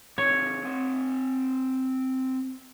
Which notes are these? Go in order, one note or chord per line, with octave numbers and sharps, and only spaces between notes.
C3 D#3 C#5
C4 F#5